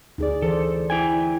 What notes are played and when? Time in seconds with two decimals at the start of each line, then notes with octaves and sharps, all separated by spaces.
0.18 D2 D#4 G#4 D5
0.42 E3 A4 C5
0.90 E4 G5 G#5